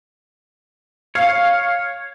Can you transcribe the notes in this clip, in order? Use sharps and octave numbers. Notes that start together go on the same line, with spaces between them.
C#5 F5